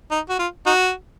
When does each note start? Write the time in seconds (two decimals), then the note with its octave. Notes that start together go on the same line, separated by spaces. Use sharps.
0.11 D#4
0.29 F#4
0.39 F4
0.66 D#4 F#4